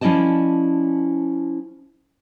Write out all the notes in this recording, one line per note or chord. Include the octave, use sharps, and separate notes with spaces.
F3 C#4 E4 D5 D#5 A5